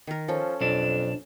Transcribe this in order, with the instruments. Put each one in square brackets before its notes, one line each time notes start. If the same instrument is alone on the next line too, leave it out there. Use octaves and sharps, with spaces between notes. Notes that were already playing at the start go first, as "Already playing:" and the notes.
[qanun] D#3 A#4
[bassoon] F3 [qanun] C#4 A4
[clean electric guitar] B1 D4 [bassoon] F2